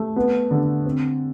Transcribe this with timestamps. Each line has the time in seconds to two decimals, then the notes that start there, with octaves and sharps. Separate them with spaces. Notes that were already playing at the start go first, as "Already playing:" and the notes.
Already playing: A3
0.16 B3
0.51 D3
0.86 C4